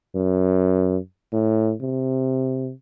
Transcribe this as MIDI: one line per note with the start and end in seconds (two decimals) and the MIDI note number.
0.15 0.98 42
1.33 1.73 45
1.82 2.71 48